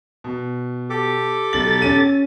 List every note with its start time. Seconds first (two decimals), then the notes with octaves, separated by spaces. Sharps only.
0.24 B2
0.90 G4 A4 D6
1.53 B1 A6 F#7
1.82 C#4 D#7